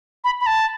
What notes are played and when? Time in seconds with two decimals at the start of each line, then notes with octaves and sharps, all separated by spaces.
0.24 B5
0.41 B5
0.47 A5